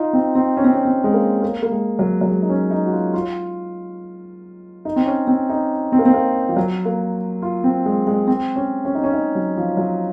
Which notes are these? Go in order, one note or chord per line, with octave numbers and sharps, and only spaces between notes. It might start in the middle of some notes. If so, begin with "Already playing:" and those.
Already playing: D#4 F4
C4
C4
C#4
C4
C#4
C4
G#3
A#3
A#3
A#3
G#3
F#3
F#3
G#3
D#4
C#4
D#4
F#4
F4
F4
D#4
C4
C#4
C4
D#4
C4
A#3
C4
A#3
F3
F#3
A#3
F4
C4
G#3
G#3
C4
C#4
C#4
D#4
C#4
D#4
F#3
F3
F#3